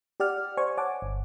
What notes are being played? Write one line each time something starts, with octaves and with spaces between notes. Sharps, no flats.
G4 D5 F#5 F6
C5 D5 G#5 C#6
C#5 F#5 G#5 A5 D6
G1